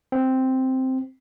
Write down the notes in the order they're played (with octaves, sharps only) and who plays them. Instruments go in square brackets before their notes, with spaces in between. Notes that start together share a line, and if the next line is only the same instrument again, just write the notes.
[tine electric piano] C4